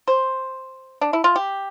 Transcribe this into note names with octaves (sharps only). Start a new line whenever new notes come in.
C5
D4
E4
F4
G4